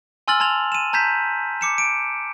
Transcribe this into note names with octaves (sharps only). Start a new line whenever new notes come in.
G#5 C6 E6 F6 A6 F#7
A5 C6 G#6 F7
D#7 E7
A5 A#5 G6 G#6 B6
D6 C#7 E7
D7